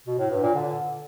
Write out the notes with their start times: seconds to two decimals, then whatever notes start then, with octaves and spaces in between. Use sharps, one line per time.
0.07 B2
0.19 A2
0.31 G2
0.43 A#2
0.55 D3